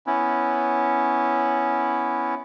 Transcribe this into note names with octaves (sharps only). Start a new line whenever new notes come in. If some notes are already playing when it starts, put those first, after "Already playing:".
B3 C#4 E4